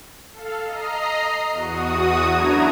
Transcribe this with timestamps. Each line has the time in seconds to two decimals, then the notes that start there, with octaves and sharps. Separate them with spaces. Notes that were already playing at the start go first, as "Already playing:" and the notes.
0.32 A4 F5
0.65 D#5 A#5 C7
1.51 E2 F#4 D#6
2.30 F#2 A3 D4 E4 A#5 G#6